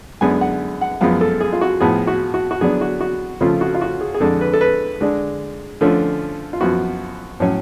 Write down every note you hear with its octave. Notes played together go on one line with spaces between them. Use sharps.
F#2 D3 G#3 B3 D4 G#5
F#5
F#5
F#2 F3 G#3 B3 F5
A4
G#4
F4
F#4
A2 F3 B3 G#4
F#4
F#4
F#4
D3 F#3 B3 D4 G#4
F#4
F#4
C#3 F3 A3 F4
F#4
F4
F#4
G#4
G#4
F2 D3 G#3 D4 A4
B4
A4
B4
D3 G#3 D4
D3 F3 A3 C#4
F4
F#2 F3 B3 F#4
A2 F#3 C#4